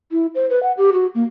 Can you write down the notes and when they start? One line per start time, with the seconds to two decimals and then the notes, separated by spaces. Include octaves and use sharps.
0.12 E4
0.35 C5
0.50 B4
0.63 F#5
0.77 G4
0.93 F#4
1.15 A#3